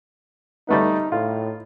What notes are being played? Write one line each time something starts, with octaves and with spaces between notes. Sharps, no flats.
G3 A3 B3 D#4
A2 F4